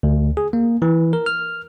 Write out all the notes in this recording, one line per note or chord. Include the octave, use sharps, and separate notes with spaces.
D2
G#4
A#3
E3
A#4
F6